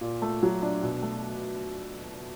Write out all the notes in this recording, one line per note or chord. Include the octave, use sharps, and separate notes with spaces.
A#2
A3
F#3
D4
B2
A3